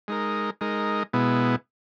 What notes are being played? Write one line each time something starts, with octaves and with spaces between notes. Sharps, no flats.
G#3 D#4 A#4
G#3 D#4 A#4
B2 G#3 B3 E4